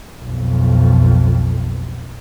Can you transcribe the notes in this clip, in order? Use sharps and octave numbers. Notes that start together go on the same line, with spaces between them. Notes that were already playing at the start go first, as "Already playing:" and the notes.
B1 F2